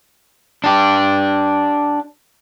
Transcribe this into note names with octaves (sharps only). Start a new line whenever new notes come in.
D4 G4